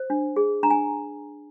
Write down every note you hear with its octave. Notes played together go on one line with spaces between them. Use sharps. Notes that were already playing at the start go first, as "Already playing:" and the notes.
Already playing: C5
D4
G#4
D4 A#5
G#5